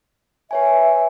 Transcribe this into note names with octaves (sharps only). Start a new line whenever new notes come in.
B4 C#5 E5 G#5